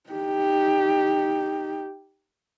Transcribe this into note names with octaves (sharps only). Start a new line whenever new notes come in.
D#4 G4